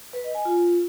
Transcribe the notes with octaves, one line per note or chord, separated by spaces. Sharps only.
B4
D#5
G#5
F4